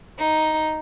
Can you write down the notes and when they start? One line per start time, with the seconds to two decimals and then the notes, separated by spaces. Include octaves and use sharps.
0.19 D#4